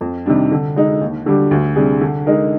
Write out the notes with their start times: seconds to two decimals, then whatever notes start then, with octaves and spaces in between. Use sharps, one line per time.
0.01 F2
0.26 C3 D#3 G3 D4
0.51 D3
0.76 G#3 D#4
1.01 D#2
1.26 D3 G3 D4 G4
1.51 D2
1.76 C3 G3 D4 G#4
2.01 D3
2.26 G#3 D#4 A#4